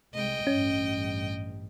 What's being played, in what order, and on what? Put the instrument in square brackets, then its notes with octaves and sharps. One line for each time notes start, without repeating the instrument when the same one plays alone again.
[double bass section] C2 G#3 [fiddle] D#5 G5
[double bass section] A1 G2 [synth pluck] C#4